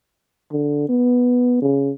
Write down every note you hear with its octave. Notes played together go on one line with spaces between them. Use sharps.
D3
B3
C#3